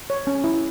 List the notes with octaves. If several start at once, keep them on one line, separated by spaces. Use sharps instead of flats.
C#5
C#4
E4